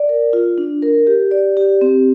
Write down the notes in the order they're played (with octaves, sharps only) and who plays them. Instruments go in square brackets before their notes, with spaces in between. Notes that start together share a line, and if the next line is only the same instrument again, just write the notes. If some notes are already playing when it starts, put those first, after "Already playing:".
Already playing: [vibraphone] D5
A#4
F4
D4
A#4
G4
D5
G4
C4